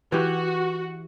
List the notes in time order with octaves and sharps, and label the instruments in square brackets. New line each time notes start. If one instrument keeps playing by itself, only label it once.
[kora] E3 G4 [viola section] F#4